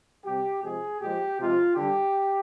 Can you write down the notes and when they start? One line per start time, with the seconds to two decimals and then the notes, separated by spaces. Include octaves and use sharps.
0.24 C3 G3 G4
0.62 C3 F3 G#3 G#4
1.00 A#2 F3 G#3 G4
1.38 C3 F3 G#3 F4
1.75 D3 G3 G4